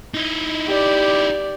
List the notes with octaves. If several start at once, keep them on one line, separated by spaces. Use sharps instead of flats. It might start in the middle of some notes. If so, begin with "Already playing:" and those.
D#4 E4
G4 D5